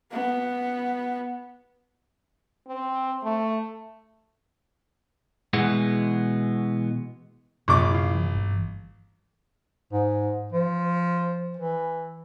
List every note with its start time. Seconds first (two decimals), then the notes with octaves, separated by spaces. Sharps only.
0.12 B3
2.68 C4
3.24 A3
5.53 B2 E3 G#3 B3
7.68 A#1 F#2 C3 D6
7.91 E4 F5
8.15 E3
8.35 G1
9.93 G#2
10.52 F3
11.57 E3